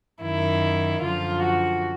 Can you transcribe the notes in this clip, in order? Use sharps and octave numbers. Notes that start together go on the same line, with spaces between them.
F#2 D#3 E4
F#2 D3 F3 F4
F#4